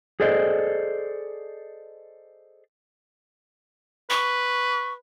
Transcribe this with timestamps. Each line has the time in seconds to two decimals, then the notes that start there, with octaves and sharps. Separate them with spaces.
0.20 G#4 A4 C5 D5 D#5
4.10 B4 C#6